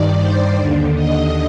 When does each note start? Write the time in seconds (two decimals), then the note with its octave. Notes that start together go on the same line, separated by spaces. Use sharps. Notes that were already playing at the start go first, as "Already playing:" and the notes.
Already playing: G2 D#3 D5
0.17 C5
0.55 D#2 D3
0.95 D#5